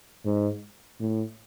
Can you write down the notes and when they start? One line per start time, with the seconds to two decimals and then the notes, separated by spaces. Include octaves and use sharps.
0.25 G#2
1.00 A2